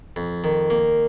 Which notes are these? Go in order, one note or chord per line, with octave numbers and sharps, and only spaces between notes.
F2
D#3
A#3